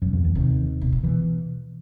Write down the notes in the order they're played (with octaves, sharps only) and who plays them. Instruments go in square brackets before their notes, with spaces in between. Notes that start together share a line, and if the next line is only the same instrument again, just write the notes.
[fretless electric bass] F#2 F#3 [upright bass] B2
[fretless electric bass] F2 F3
E2 E3
[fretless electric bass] D#2 D#3 [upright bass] C3
[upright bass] B2
A#2
[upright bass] B2 [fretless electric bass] E3